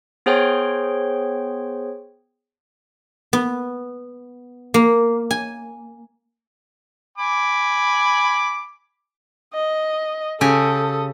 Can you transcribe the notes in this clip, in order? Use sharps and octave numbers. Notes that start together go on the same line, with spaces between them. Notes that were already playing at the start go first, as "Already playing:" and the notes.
B3 G#4 C5 C#5 G5 C6
B3
A#3
G#5
G#5 B5 D6
D#5
C#3 G4 A4 G#5 D#6